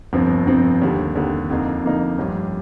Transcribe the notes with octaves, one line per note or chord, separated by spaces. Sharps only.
G1 F2 C3 F3 C4
G1 F2 C3 F3 C4
D#2 D3 G3
D#2 D3 G3
F2 D3 F3 A#3 D#4
F2 D3 F3 A#3 D#4
A1 G2 F3